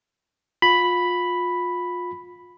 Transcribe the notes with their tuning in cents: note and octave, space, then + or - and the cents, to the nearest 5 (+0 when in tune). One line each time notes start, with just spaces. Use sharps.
F4 +30 B5 +0